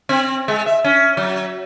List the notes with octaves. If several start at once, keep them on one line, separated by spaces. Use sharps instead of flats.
C4
G#3
E5
C#4
F#3